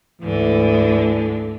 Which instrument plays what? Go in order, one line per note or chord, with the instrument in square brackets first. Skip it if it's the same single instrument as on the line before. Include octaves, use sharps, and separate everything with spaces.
[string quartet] D2 G#2 D3 [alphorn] E3